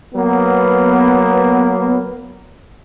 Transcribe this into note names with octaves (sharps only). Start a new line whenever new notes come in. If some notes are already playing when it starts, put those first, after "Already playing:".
F#3 A#3 B3